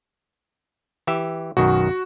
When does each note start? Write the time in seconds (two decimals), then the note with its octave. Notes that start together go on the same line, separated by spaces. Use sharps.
1.07 E3 G4 E5
1.57 B1 F#2 D#3 F#4